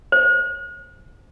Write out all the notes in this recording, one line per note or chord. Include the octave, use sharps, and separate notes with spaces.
C5